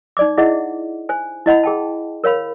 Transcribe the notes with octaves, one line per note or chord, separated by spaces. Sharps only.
D#4 D5 D6
E4 G#4 D#5 E5 F#5
C5 G#5
E4 D#5 F#5 B5
G#4 G5 A5
A#4 C#5 F5 B5